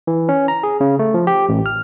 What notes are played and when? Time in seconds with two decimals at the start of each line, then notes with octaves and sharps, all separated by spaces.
0.07 E3
0.29 C#4
0.48 A#5
0.63 G#4
0.81 C#3
0.99 A3
1.14 F3
1.27 G4
1.49 A1
1.66 F6